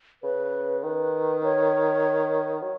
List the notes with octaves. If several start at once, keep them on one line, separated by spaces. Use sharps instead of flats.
C#3 B4
D#3 B4
C#5
F#3